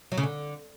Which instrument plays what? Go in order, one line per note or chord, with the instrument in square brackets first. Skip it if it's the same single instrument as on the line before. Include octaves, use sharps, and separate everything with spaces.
[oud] F#3
C#3
D3